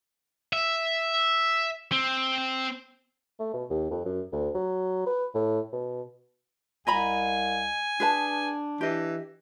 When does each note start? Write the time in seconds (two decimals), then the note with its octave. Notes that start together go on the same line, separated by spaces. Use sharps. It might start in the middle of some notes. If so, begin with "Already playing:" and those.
0.53 E5
1.92 C4
3.40 A3
3.54 B2
3.70 D#2
3.91 F2
4.05 F#2
4.32 D2
4.55 F#3
5.06 B4
5.35 A2
5.72 B2
6.87 C2 D#5 G#5 A#5 B5
8.00 D4 G#4 B4 A5
8.81 E3 G4 D#5